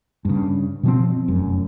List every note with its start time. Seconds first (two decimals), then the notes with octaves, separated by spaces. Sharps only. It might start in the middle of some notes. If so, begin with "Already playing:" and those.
0.25 G2 C#3
0.83 B2 F3 C4
1.28 F1 F#2